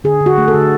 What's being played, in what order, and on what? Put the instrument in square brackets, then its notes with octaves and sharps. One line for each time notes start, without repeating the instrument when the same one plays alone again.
[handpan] D3 G#4
D3
F#4
A3
A4
D3